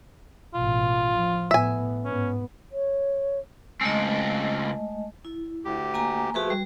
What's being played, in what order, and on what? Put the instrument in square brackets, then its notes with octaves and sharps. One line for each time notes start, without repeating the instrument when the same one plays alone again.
[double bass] A1 B2 [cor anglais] F4
[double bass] F3
[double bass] A2 B3 [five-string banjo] E5 G#5
[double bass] G#2 B3 [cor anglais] C#4
[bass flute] C#5
[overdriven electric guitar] C#2 C4 [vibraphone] G#3 A3 D#5
[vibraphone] E4
[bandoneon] D2 G4
[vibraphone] A#3 G#5 A#5
[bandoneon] F3 A3 [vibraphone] F#4 G#4 B4
[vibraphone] G3